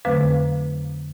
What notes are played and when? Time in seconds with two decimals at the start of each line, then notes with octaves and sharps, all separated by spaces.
0.05 F2 D3 F#3 A3 C4 B4